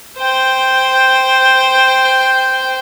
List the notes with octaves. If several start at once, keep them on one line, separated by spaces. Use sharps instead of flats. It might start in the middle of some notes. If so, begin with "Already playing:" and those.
C5 G5